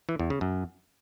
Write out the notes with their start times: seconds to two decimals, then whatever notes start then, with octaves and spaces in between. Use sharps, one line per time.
0.09 E3
0.19 E2
0.30 C#3
0.41 F#2